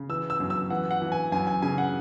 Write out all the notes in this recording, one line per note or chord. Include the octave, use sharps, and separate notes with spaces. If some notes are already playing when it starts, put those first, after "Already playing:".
Already playing: C#3
E3 E6
E6
F#2
E6
E3 F#5
F#5
E3
G#5
F#2 G#5
G#5
C#3 G#5
F#5